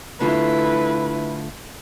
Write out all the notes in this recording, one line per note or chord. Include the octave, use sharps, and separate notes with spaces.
D3 A3 E4 F4 B4